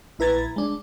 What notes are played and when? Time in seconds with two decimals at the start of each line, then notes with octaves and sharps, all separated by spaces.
0.19 A#1 E4 B4 A#5 G#6 A6
0.56 G#3 D4